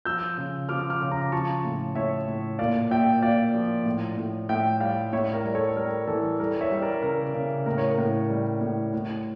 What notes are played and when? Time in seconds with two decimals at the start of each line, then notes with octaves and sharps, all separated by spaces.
0.05 F3 E6 G6
0.38 C#3
0.69 F3 D6 F6
0.90 D6 F6
1.02 C#3
1.11 A#5 D6
1.32 F3 A5 C#6
1.65 A2
1.95 A2 C#5 E5
2.27 A2
2.59 A#2 D5 F5
2.91 A#2 E5 G5
3.22 A#2 D5 F5
3.54 F3
3.86 A2
4.17 A2
4.49 A2 E5 G5
4.81 G3 D5 F5
5.13 A2 C#5 E5
5.34 A#4
5.45 G3
5.55 A4 C#5
5.76 G3 A#4
6.07 E3 A4
6.39 G3 A#4
6.61 C#5 E5
6.72 G3
6.82 A#4 D5
7.02 C#3 A#4
7.34 C#3
7.66 A2 A#4
7.78 C#5
7.91 A#4
7.98 A2
8.30 G3
8.61 A2
8.94 A2